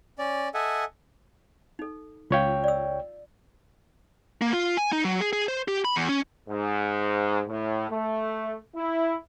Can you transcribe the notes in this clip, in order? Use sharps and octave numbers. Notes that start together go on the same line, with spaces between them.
C#4 D5
A4 D#5 E5 F#5 G#5
D#4 A4
C#2 F4 C#5 F5 G5
D5 E6
A#3
F4
G#5
D#4
F#3
G#4
G#4
C5
G4
B5
E2
C#4
G#2
A2
A3
E4